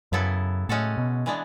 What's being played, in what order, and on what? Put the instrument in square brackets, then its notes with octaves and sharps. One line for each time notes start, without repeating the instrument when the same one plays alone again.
[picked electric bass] F#2 [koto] C#3 F#3 B3 E4 A4
[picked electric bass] A2 [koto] G#3 C#4 F#4 A4
[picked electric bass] B2
[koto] E3 G#3 B3 D4